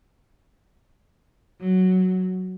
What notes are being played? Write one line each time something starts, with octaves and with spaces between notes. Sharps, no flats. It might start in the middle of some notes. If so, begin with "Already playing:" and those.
F#3